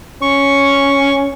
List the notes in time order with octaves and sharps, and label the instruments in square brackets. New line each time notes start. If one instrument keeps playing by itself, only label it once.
[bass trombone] C#4 [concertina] C#6